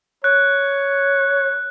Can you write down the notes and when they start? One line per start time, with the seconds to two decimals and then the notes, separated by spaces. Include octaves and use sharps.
0.24 C#5 F#6